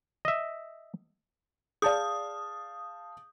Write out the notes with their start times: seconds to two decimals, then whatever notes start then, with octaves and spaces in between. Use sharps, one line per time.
0.25 D#5 E5
1.82 G#4 D5 F5 A5 D#6 G6